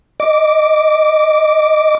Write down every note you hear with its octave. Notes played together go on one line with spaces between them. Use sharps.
D#5 D6